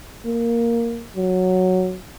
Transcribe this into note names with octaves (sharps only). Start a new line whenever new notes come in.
A#3
F#3